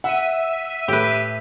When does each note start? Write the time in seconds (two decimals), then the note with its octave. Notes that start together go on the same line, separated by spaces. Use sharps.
0.04 E5 F#5 D#7
0.88 A2 G4 B4